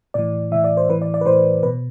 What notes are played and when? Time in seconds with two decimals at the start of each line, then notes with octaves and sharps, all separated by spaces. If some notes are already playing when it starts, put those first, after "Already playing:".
0.14 A2 E3 D5
0.51 A2 E3 E5
0.64 D5
0.77 C5
0.89 A2 E3 B4
1.02 D5
1.14 D5
1.21 B4
1.26 A2 E3 C5
1.63 B2 B4